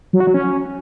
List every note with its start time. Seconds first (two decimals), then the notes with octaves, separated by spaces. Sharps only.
0.13 F#3
0.20 F#4
0.27 F#3
0.34 C#4